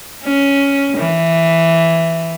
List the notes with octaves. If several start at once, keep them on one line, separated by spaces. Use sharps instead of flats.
C#4
E3